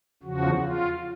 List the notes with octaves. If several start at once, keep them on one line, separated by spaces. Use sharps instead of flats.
E2 C#3 F3 F#4
F4